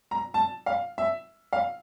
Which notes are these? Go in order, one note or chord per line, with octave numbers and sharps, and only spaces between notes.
A#5
A5
F5
E5
F5